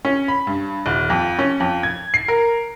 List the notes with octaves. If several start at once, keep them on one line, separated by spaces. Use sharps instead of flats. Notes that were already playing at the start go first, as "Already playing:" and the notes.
C#4
B5
G2
D#1
F2
C#4
F2
G#6
C7
A#4